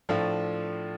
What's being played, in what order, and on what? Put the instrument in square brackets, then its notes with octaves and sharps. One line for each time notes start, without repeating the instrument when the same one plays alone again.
[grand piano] A2 F3 A3 D4 F4